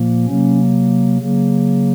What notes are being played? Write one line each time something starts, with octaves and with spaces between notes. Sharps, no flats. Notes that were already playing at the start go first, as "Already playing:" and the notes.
Already playing: A#2 F3 A#3
C3 F#3 A#3 C#4
C#3 F#3 A#3